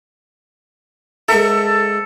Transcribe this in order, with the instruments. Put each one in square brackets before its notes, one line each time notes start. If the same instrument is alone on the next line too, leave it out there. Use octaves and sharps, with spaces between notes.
[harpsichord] G#2 A#4 E5 [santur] A4